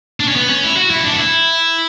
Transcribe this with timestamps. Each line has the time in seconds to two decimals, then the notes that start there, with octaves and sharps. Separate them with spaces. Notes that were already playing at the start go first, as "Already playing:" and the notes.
0.20 D4
0.28 C#4
0.36 B3
0.50 C#4
0.64 E4
0.77 F#4
0.91 E4
0.99 C#4
1.04 D4
1.13 F#4
1.18 E4